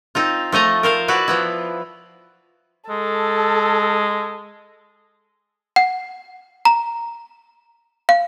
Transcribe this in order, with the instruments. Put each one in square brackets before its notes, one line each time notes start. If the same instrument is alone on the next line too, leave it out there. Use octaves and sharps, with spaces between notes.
[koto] C4 D#4 F4
F3 A3 D#5 A#5
A#4 C5 F5
E4 F#4 B4 D5
F3 B3 E4
[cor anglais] G#3 [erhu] A4
[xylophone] F#5
A#5
F5